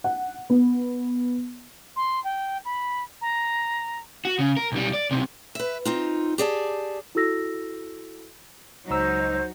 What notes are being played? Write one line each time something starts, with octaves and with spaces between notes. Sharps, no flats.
F#5
B3
C6
G5
B5
A#5
F#4
C#3
A#4
B1 G3
D5
B1 C3
B4 E5
C4 D#4 F4
G4 G#4 D5 A5
E4 F#4 A4 E6 A#6
C#2 F#3 D#4 C5 A#5 E6